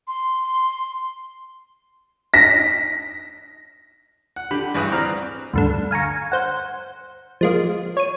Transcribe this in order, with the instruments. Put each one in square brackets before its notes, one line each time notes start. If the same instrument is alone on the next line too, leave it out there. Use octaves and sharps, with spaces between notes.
[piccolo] C6
[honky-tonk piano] A#6 B6
[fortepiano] F#5
D3 G4 B5
A1 G2 G#4 B4 D#6
C4 D5 A#5 F6 F#6
[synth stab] D2 G2 D3
F5 G#5 A#5 C#6
C5 F#5
F3 G#3 A#3
C#5 D#7